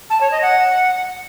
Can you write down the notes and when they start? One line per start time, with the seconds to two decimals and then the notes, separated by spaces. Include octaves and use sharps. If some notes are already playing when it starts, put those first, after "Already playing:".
0.10 A5
0.21 C#5
0.31 D#5
0.42 F#5